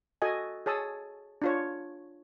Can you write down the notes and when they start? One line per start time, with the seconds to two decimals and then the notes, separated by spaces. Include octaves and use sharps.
0.22 F#4 A4 D#5 G#5
0.66 G#4 C#5 A5 D#6 E6
1.42 D4 F4 C#5